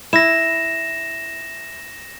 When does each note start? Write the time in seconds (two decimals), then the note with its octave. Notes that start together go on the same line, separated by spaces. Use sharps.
0.13 E4 A#6 E7